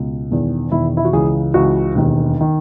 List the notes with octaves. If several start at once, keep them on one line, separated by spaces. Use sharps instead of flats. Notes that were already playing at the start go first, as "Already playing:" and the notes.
Already playing: C#2 B2
E1 E2 D#3
E1 E2 D#3 E4
E4
F#4
C#2 C#3 E3 G#4
C#2 C#3 E3 F#4
E1 D#2 D#3
D#3